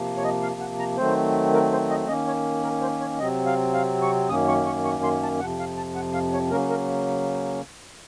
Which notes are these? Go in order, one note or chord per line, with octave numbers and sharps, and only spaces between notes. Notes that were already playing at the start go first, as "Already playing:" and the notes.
Already playing: C3 F3 A#3
C#5
D#5
F5
F#5
A#5
D#3 F#3 A3 C4 C5
A#4
C5
D#5
D#3 A#3 C#4 D#5
C#5
A#4
C5
C#5
C3 F#3 C4 D#5
F5
F5
C#6
F#2 D#3 A#3 C#4 D#6
C#6
C#6
C#6
C6
A5
F2 C3 F3 F#5
F5
A5
F#5
F5
C#5
C#3 F#3 A#3 C#4 A#4
A#4